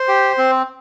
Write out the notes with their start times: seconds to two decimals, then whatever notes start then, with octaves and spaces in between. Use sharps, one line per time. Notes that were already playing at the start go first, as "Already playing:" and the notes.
Already playing: C5
0.08 G4
0.38 C4